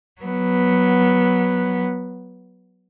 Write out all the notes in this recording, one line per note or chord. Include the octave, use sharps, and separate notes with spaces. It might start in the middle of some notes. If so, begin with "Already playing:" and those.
F#3 B3